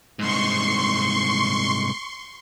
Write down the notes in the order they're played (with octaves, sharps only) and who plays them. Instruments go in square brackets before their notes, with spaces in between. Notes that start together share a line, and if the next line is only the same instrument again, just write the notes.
[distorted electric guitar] C2 G#2 [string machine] C6 C#6